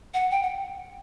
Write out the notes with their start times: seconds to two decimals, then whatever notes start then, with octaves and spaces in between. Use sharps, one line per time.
0.14 F#5
0.31 G5
0.43 F#5